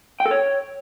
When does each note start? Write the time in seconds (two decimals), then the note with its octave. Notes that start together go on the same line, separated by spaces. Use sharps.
0.20 G5
0.26 A4
0.31 C#5